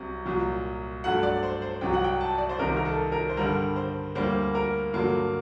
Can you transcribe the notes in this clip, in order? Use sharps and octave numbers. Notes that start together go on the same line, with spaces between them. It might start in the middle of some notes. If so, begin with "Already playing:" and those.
Already playing: C2 C3 F#3
C2 A#2 F#3
G2 F#3 A3 F#5
D5
C5
C5
C2 C3 F#3 G5
F#5
G5
A5
D5
C5
C2 C3 D#3 A#4
A#4
A4
A#4
C5
G2 D3 G3 A#4
C5
D2 D3 G3 A#3 C5
A#4
G2 D3 F#3 A#3